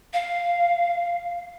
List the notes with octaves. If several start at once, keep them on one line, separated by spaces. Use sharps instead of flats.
F5